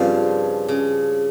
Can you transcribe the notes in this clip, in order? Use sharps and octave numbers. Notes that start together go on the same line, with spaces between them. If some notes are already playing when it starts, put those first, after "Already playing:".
Already playing: G2 C#3 F3 C4
C#3